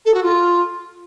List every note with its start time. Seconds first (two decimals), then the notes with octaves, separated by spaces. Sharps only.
0.05 A4
0.14 F#4
0.23 F4